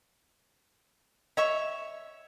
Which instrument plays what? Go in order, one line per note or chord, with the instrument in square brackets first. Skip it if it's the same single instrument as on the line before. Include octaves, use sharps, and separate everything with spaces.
[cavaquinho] C#5 E5 C#6 [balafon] D#5